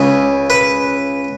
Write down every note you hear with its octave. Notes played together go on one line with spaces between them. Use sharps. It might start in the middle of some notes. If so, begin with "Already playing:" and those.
Already playing: C#2 C#3 B4
B4